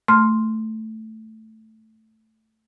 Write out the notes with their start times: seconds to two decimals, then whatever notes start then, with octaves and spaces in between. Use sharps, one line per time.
0.08 A3 C6 F6